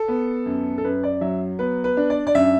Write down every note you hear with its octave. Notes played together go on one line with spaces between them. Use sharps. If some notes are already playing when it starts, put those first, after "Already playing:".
Already playing: A4
B3
F#2
A4
F#2 B4
D5
F#3 E5
B3 B4
B4
D4
D5
D5
F#2 E5